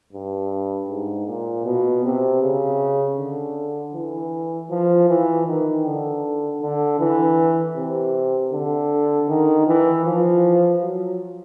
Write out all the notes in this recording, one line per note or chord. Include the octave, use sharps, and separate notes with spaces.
G2
G#2
A#2
B2
C3
C#3
D3
E3
F3
E3
D#3
D3
D3
E3
C3
D3
D#3
E3
F3
F#3